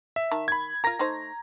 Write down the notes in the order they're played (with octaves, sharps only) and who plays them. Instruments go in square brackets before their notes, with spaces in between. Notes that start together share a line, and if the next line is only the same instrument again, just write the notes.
[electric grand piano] E5
[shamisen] D#3 A5
[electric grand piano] B5 G#6
[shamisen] F4 A#4 [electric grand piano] A#5 A#6
[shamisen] A3 D#4 C5